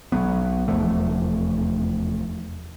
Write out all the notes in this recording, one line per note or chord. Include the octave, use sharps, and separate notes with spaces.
B1 F#3 B3
F1 E2 F3 A3